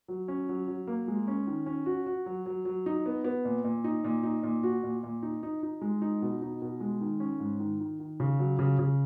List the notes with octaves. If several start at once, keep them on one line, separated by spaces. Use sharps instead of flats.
F#3
C#4
F#3
F#3
A#3
G#3
C#4
D#3
C#4
F#4
F#4
F#3
F#3
F#3
D#4
B3
B3
A#2
A#2
D#4
A#2
D#4
A#2
F#4
A#2
A#2
D#4
D#4
D#4
G#3
D#4
B2
D#4
B2
G#3
D#3
C#4
G#2
D#3
D#3
D#3
C#3
F#3
C#3
C#3